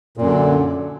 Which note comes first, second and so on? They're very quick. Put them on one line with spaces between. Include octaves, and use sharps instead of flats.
A#2 F#2 D3